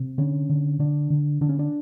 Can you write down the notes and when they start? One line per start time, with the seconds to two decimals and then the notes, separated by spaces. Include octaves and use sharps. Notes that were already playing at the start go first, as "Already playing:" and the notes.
Already playing: C3
0.18 D3 C#4
0.49 D3
0.79 D3 D4
1.10 D3
1.41 D3 D4
1.49 C#4
1.59 D4